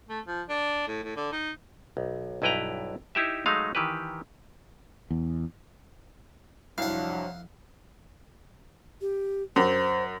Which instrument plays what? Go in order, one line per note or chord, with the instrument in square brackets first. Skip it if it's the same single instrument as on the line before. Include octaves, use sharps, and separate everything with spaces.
[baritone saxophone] A3
F3
D4
A2
A2
D3
D#4
[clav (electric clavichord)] B1
B1 G2 E4 B4 G5 A#5
D#4 E4 G4 E5
F#3 G#3 A3 D#4 F5
D#3 E3 G4 B4
[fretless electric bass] E2
[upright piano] C2 [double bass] F2 [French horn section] F3 F#3 D4 [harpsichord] F5 F#5
[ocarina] G4
[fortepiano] F#2 [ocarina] C5